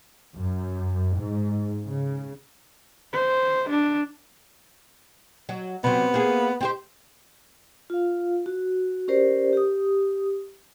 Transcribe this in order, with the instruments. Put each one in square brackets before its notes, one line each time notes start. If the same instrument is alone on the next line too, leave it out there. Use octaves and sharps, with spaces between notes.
[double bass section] F#2
G#2
C#3
[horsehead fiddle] C5
D4
[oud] F#3
[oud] C3 F#3 [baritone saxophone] B3
[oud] A#3 G#4
C4 G4 C5
[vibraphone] F4 F5
F#4
C#4 G4 A#4 C5 D5
G4 D#6